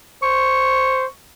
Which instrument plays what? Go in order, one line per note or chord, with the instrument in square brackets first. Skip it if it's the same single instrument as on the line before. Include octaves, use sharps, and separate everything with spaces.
[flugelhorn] C5 [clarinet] C#6